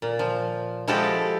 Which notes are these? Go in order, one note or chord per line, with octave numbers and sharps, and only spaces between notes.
A#2
F3
F3 G#3 E4 F#4 G4 A4